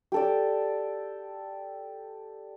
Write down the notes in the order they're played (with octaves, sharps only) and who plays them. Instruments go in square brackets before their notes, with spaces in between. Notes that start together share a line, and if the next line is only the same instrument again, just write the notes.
[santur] G4 A4 D5